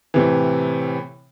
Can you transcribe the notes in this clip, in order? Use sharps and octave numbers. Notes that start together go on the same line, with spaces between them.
A2 C3 E3